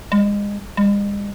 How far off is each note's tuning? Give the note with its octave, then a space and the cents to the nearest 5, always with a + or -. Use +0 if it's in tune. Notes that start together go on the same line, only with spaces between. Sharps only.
G#3 -30
G#3 -45